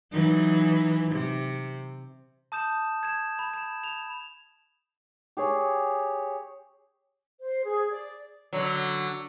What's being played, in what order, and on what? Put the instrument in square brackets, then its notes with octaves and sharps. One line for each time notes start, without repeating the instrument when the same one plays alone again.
[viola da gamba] E3 F#3 D#4
C3
[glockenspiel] A5 D#6 G6 E7
G#6 E7
B5
E7
F7
[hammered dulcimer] G4 G#4 C#5
[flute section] C5
G#4
D5
[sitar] D3 F#3